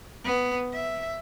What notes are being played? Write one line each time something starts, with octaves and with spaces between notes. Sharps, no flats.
B3
E5